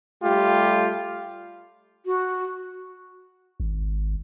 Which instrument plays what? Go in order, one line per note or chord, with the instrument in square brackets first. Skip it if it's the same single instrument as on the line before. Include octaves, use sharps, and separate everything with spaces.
[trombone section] G3 A3 F4 G4
[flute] F#4
[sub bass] G#1